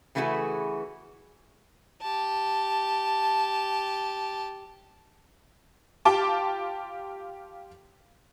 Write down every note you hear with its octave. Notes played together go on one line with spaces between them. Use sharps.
C#3 E3 A3 F#4 G#4 B4
G4 A5
F4 G4 G5 A5 D6